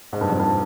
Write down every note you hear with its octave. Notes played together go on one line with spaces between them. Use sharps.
G#2
G2
F2
G2